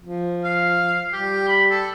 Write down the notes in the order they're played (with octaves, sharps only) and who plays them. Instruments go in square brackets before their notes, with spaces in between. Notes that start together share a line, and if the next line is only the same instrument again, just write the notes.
[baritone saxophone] F3
[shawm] F5
[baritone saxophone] G3 [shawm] G4
[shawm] B5
A4